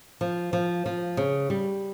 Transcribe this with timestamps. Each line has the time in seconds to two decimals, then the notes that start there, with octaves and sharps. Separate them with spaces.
0.21 F3
0.53 F3
0.86 F3
1.17 C#3
1.50 G3